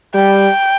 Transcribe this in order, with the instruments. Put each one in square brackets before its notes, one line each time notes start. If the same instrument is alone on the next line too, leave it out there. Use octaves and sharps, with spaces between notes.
[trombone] G3 [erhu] G5